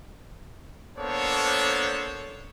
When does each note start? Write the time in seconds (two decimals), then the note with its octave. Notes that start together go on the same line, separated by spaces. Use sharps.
0.97 A#3 B3 D4 A4 C5 C#5